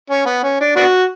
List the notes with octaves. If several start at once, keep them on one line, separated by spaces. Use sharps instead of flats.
C#4
B3
C#4
D4
B3 D4 F#4